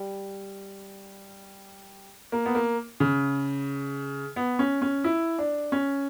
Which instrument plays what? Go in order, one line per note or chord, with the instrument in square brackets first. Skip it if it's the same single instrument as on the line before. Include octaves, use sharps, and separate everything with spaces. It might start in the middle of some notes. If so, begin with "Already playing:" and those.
Already playing: [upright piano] G3
A#3
B3
A#3
C#3
B3
C#4
C#4
E4
D4
C#4